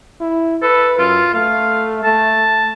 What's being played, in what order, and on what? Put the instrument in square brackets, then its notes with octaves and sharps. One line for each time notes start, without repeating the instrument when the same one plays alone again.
[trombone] E4
[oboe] A4 [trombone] B4
[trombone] F#2 [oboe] F4
[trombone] A3 [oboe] F5
[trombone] A3 [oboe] A5